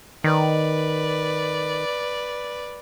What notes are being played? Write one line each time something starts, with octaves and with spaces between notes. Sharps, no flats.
D#3 B4 D5